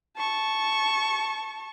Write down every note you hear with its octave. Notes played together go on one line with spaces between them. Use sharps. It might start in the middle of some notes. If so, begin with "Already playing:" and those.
A5 C#6